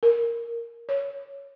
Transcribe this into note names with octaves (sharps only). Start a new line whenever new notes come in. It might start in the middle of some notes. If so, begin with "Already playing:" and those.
A#4
C#5